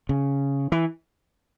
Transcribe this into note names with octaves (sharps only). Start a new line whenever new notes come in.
C#3
E3